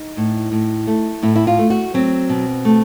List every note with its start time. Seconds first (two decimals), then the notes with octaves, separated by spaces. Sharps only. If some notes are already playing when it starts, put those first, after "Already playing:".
Already playing: D#4
0.17 A2
0.52 A2
0.87 A3
1.23 A2 E4
1.36 E4
1.47 F4
1.59 A3
1.70 F#4
1.94 F#3 C4
2.29 B2
2.65 A3